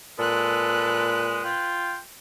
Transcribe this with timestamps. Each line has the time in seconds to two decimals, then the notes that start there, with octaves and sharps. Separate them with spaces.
0.19 A#2 G#3 A4 B4 F#6
1.44 F4 G5